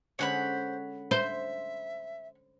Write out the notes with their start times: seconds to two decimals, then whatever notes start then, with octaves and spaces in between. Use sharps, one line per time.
0.19 D3 G#3 C#4 C5 C#5 F#5 B5
1.11 C5 E5